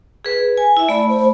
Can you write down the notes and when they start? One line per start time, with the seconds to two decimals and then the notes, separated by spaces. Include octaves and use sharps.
0.25 G#4 B4
0.57 G#5
0.77 E4 E5
0.89 A3 D5 B5
1.09 C5